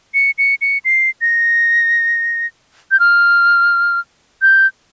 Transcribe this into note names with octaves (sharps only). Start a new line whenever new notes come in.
C#7
C#7
C#7
C7
A#6
G6
F6
G6